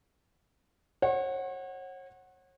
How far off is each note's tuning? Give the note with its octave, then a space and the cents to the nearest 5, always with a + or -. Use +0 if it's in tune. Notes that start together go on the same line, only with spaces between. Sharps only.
C#5 -40 F#5 +0